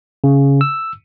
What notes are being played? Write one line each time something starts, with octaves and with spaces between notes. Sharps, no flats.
C#3
E6